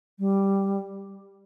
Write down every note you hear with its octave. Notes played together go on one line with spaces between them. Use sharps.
G3